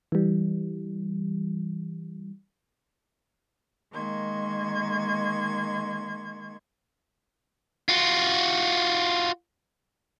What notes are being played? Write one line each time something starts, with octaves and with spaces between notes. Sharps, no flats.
E3 G3
D#3 G#3 A#3 C6 C#6 G#6
F4 F#4